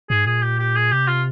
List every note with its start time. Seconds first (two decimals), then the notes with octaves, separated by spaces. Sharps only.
0.10 G#2 G#4
0.26 A#2 G#4
0.43 G4
0.59 G4
0.76 G#4
0.91 C3 G4
1.08 F4